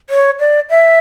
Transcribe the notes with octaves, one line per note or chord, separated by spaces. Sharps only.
C#5
D5
E5